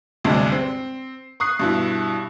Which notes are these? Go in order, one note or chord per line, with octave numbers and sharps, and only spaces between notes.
D2 G2 C3 G#3 D4
C4
C#6 D#6 F#6 C7
G2 B2 E4